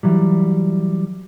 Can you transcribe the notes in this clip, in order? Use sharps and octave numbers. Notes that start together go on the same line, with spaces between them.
E3 F#3 G3